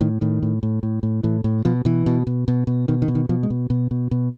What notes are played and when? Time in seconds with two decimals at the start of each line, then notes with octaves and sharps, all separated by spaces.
0.01 A2 D#3
0.21 A2 D#3
0.43 A2
0.63 A2
0.83 A2
1.03 A2
1.23 A2 E3
1.44 A2
1.65 B2 F3
1.85 B2 E3
2.06 B2
2.27 B2
2.48 B2
2.67 B2
2.88 B2 D#3
3.02 D#3
3.08 B2
3.15 D#3
3.29 B2 F3
3.43 G#3
3.50 B2
3.70 B2
3.91 B2
4.11 B2